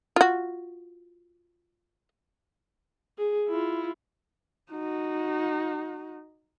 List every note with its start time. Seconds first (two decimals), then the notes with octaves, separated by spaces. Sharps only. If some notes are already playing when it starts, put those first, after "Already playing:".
0.16 F4 F#4
3.18 G#4
3.48 E4 F4
4.71 D#4 F#4